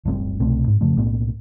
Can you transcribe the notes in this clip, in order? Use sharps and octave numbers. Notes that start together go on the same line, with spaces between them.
D1 G1 G3 C4
C2 B2 A3 C4
G#2
F2 C#3 F3 A3
B1 A2 A#3 B3